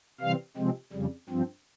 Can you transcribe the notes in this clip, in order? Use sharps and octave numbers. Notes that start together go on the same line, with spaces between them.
C3 E3 G3 C4 F5
C3 F3 G#3 C4
F2 C#3 G3
G2 F3 C4